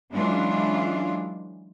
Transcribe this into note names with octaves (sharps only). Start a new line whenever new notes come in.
E3 F#3 G#3 C#4 D4 F4